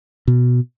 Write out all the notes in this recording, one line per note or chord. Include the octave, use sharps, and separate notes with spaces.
B2